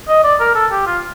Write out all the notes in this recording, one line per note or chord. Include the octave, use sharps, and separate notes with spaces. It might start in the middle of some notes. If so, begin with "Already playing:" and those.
D#5
D5
A#4
A4
G4
F4